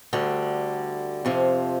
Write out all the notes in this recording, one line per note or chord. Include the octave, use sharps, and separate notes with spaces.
D2 D3 G3
F2 C3 F3